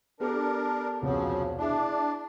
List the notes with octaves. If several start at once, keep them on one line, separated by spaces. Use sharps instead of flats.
B3 D4 G4 A4 A#4
E1 C2 C#3 F3 F#3
D4 E4 G#4 E5